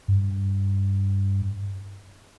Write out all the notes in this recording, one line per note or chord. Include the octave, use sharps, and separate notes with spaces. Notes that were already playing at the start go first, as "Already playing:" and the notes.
G2